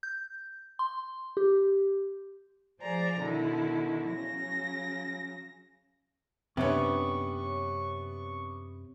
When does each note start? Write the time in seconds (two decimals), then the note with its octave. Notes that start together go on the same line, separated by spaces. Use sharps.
0.03 G6
0.79 C6
1.37 G4
2.81 F3 G#4 C5 D5 A#5
3.19 B2 D3 D#3 E4
4.10 C#3 F#3 A#6
6.57 F#2 C3 B3 C#4 D4 B4 C#6